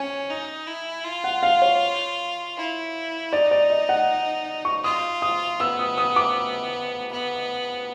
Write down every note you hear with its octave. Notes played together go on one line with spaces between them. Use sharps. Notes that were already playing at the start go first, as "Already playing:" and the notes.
Already playing: C#4 G#5
D#4
E4
F4
F#5
F5
C#5
E4
D#4 D5
D5
D#5
F#5
C#6
F4 D#6
D#6
B3 E6
D#6
D#6
D6
B3